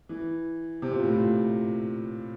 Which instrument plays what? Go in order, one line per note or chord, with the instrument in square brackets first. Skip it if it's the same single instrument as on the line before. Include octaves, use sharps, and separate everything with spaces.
[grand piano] E3
C3
A#2
A2
A#2